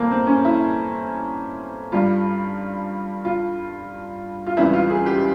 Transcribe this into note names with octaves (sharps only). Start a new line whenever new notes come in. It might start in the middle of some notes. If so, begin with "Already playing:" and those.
Already playing: F2 E3 G3 A#3 C4
C4
C#4
E4
G2 G3 F4
F4
F4
C#2 C3 E3 G3 E4
F4
G#4
G4